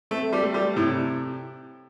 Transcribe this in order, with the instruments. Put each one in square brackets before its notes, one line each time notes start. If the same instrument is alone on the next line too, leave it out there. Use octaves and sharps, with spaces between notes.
[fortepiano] A3 [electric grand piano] C4
[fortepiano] G3
[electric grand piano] A3
[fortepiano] G3
[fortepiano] A2 [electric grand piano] C3